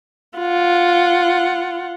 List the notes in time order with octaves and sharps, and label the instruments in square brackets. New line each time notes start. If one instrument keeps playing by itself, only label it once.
[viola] F4 F#5